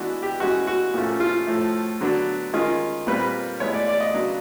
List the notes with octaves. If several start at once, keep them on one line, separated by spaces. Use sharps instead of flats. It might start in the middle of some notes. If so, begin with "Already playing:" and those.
Already playing: E3 G#3 B3 D4 F#4
G4
E3 G#3 C#4 F#4
F#4
A#2 F3 A3 C#4
F4
A2 F3 A3
D3 F#3 B3 D4
D#3 G#3 C#4 F4
A#2 G3 C4 B4
A2 E3 G#3 B3 C#5
D5
D5
D#5
C#3 F#3 B3 D4